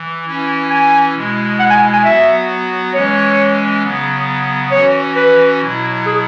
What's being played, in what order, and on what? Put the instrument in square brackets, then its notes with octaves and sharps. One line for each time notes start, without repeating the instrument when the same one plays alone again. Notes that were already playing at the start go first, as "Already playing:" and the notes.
Already playing: [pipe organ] E3
E3 C#4 E4
[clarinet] G#5
[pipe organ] B2 G#3 E4
[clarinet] F#5
G#5
G#5
[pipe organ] F#3 B3 F#4 [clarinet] E5
[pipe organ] E3 G#3 C#4 [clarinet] C#5
[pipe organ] C#3 F#3 B3
[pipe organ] E3 C#4 F#4 [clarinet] C#5
[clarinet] B4
[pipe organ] B2 F#3 E4
[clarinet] G#4